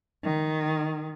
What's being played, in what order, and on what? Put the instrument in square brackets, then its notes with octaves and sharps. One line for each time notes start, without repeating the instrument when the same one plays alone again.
[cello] D#3